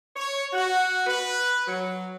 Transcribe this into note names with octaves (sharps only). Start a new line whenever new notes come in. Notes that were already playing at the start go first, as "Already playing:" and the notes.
C#5
F#4
B4
F#3